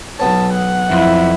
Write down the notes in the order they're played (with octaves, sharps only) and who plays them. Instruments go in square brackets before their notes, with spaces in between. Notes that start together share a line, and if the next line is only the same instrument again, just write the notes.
[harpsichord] B1 B3 C#5 [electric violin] A5
[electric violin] F#5
[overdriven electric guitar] F2 [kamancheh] E4